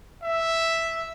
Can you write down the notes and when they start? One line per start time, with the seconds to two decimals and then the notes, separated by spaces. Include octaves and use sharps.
0.22 E5